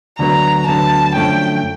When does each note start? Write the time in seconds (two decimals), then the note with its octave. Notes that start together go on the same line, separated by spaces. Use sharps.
0.19 D2 D3 F#3 B3 A#5
0.67 D2 D3 F#3 B3 A5
1.15 F#2 D3 F3 A3 C#4 G5